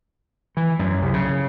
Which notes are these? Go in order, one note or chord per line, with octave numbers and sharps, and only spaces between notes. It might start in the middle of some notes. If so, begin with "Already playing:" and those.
E3
F#2
C2
C#3